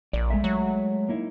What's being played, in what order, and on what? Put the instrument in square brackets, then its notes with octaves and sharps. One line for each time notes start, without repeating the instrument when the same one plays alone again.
[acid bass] A#1 [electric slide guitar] D5
[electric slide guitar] G#3 A3 E5
[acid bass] F#3
[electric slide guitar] A#3 D#4 E4